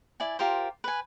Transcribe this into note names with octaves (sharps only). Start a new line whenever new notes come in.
E4 D5 G#5
F4 G4 A#4 C5
B4 G#5